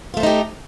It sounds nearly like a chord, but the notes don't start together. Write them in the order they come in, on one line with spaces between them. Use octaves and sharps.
F4 A3 C5 D#4 G4